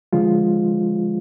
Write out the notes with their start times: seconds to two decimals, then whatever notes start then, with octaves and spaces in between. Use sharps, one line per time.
0.13 D3 F3 G#3 F4